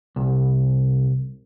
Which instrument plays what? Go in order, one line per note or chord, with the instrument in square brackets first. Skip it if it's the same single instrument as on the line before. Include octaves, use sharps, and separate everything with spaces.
[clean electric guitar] C2